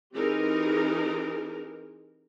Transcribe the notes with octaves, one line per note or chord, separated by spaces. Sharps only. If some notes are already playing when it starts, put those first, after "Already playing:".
E3 C4 D#4 G4 G#4 A#4